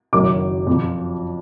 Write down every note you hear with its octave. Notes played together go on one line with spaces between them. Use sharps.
F#1 F#2 D#3 D6
F2 F3